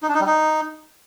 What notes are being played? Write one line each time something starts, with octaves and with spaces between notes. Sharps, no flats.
D#4
D4
D#4
G3
D#4